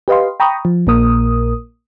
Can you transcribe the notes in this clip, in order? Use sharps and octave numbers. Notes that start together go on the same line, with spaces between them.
G4 B4 D#5 F5 C6
G5 A#5 B5 C#6 D#6
F3
A#1 A#2 A#3 A#4 D#6